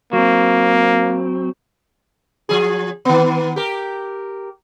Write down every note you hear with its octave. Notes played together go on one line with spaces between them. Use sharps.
F#3 A#3 C4
F3 G#4
D#3 B3
G4 A#4